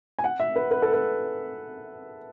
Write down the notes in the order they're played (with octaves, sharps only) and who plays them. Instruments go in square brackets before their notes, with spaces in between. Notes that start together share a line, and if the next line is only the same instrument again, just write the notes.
[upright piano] G#5
F#5
E5
B4
B4
A4
B4